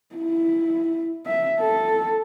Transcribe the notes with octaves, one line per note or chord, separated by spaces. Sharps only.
E4
E5
A4